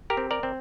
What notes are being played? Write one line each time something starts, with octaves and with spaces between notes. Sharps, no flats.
G4 A#4
C4
A#4 D5
C4